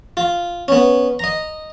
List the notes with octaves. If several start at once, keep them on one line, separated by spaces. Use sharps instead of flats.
F4
B3 C#4
D#5 A#5